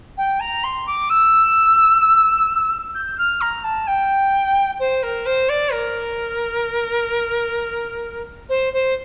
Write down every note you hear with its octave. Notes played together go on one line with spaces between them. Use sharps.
G5
A#5
C6
D6
E6
G6
F6
A#5
A5
G5
C5
A#4
C5
D5
A#4
C5
C5